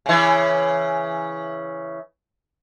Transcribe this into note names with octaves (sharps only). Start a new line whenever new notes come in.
C#3 E3